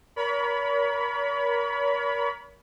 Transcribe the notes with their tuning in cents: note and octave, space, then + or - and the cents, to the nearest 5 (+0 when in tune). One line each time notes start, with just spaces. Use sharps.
A#4 +25 C#5 +40 B5 +0